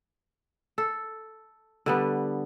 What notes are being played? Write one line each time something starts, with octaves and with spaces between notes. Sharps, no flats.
A4
D3 G3 B3